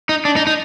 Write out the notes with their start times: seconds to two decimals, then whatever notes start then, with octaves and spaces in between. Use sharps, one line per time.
0.09 D#4
0.25 D4
0.36 D#4
0.47 D#4